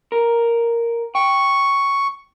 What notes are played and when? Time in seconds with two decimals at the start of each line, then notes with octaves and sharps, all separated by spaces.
0.12 A#4
1.15 G5 C#6